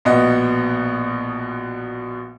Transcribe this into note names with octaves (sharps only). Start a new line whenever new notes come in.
A#1 B2 B3 D#5